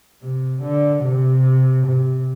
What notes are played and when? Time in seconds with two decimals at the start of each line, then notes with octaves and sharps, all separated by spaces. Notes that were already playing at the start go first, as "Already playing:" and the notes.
0.23 C3
0.63 D3
1.04 C3
1.87 C3